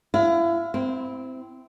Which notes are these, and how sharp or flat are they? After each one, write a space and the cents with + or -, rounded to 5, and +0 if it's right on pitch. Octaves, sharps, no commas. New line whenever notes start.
E4 +35 F5 +25
C4 -15 E4 +0